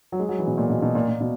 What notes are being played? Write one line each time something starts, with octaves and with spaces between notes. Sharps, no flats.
F#3
G#3
F#3
E3
B2
A#2
B2
B2
A#2
A#2
B2